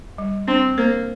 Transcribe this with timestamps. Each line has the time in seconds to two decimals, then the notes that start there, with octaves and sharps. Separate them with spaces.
0.18 G3
0.47 C4 D4
0.77 A#3 C5